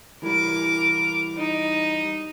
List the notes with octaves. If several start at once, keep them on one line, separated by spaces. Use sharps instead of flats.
E3 G3 A#4 D6
D#4